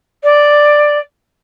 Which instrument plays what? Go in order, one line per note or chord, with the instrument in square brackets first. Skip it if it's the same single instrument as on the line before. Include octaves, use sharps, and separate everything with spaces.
[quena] D5